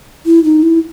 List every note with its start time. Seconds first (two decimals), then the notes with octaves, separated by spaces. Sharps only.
0.26 E4
0.44 D#4
0.63 E4